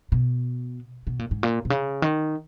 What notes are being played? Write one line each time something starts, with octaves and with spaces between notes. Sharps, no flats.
B2
B2
A#2
G#2
A#2
B2
C#3
D#3